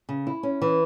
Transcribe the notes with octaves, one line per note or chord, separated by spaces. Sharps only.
C#3
E4
C#4
E3